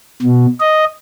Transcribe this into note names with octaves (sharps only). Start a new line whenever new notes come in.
B2
D#5